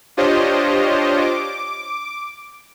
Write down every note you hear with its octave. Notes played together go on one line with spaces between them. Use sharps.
D4 F4 G4 C5 C#5 D#5
D6